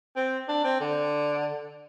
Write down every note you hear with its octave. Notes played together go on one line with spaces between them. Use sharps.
C4
D4
C4
D3